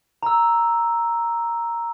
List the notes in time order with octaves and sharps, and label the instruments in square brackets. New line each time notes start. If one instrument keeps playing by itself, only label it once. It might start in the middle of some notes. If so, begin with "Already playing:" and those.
[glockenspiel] A#5 E6